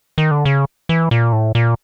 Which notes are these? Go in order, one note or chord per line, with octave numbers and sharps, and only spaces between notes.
D#3
D3
C#3
E3
A#2
A2
A#2